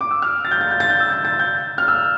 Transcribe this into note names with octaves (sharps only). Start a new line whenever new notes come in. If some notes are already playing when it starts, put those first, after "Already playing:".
D6
E6
F6
A6
G6
A6
G6
A6
G6
E6
G6
A6
G6
F6
E6